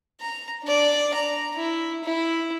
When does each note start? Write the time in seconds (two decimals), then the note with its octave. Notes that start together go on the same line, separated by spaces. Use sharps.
0.21 A#5
0.64 D4 D5
1.14 A#5
1.57 E4
2.04 E4